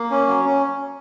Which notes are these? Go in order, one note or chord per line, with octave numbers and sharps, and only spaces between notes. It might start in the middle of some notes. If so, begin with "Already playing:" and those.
Already playing: A#3
C#4
F#3
C#4